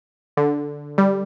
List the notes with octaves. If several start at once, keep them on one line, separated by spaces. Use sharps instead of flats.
D3
G3